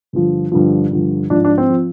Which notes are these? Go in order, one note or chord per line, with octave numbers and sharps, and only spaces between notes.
G2 D3 F3
G2 D3 F3
G2 D3 F3
G#2 F3 D4
D4
C4
F3